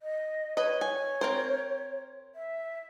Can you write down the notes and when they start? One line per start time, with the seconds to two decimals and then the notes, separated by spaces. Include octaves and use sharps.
0.02 D#5
0.57 B4 C#5 D#5
0.81 G#5
1.21 C4 A#4 C5
2.35 E5